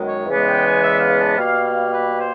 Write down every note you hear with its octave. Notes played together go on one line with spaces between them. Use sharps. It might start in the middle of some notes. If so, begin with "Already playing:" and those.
Already playing: F#2 D#3 G#3 B3
C#5
E2 C#3 E3 G#3 B3
G5
G#5
E5
F5
A5
B2 G3 A#3 F5
F5
B4
C5